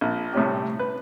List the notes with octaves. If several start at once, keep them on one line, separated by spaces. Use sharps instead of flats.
A#1
A2 C3 G3 C#4 G4
B4